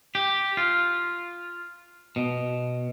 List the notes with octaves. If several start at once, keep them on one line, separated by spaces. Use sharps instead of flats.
G4
F4
B2